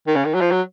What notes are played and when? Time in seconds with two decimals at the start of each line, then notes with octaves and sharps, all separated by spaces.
0.07 D#3
0.16 C#3
0.25 D#3
0.34 F#3
0.41 F3
0.51 F#3